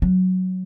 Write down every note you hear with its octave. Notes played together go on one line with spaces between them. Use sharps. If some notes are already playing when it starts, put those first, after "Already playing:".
F#3